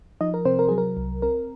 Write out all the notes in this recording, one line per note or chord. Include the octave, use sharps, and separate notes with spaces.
F3 D#4 D#5
A#4
C3 C4 C5
A#4
F#3 G#4
A#4
C2
C4 A#4